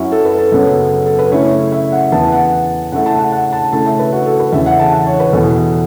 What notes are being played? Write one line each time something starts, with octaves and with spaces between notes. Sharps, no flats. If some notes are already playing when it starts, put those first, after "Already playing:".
Already playing: F#2 F#3 C#4 E4 F#4
A4
B4
A4
F#2 C#3 F#3 B3 A4
A4
B4
C#3 A3 C#4 E4 C#5
E5
F#5
E2 E3 B3 A5
F#5
C#3 A3 E4 F#5
A5
F#5
F#5
A5
C#3 A3 E4 A5
E5
B4
F#4
A4
B4
E2 C#3 E3 E5
F#5
A5
F#5
C#5
B4
E2 B2 B3 E4 A4